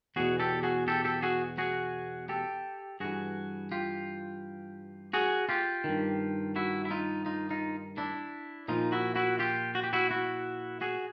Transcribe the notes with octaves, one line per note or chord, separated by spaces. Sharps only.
E2 B2 F#4 G#4
G4 A4
F#4 G#4
G4 A4
G4 A4
F#4 G#4
F#4 G#4
G4 A4
G2 E3 F#4 G#4
F4 G4
F#4 G#4
F4 G4
G2 D#3
E4 F#4
E4
D#4 F4
D#4 F4
D#4 F4
D4 E4
A#2 F3 D#4 F4
E4 F#4
E4 F#4
F4 G4
F#4
G4
E4 F#4
E4 F#4
F#4 G#4